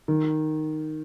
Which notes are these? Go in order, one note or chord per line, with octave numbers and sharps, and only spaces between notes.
D#3